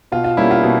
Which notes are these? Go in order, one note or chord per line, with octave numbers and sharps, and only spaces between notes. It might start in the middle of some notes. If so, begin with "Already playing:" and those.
B2 F4
F4
G3 A#3 C#4 E4
F4
B2